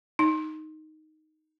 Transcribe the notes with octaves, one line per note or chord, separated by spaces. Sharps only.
D#4